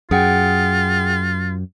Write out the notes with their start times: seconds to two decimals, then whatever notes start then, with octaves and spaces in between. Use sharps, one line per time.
0.11 F#2 F4 G#4 F#5 G5